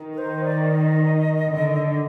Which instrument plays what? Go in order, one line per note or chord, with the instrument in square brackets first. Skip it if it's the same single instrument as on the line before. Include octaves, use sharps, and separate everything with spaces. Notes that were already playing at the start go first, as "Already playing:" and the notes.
Already playing: [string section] D#3
[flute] A#4
C5
D5
D#5
[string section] D3